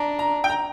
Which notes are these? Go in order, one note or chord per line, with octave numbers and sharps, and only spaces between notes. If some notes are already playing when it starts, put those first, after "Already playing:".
Already playing: D4 A#5
A#5
G5
A#5